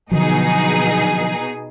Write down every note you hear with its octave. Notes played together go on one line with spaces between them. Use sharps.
B2 D3 F3 F#3 D#4 G#4